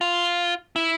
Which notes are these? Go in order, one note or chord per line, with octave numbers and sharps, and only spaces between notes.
F4
E4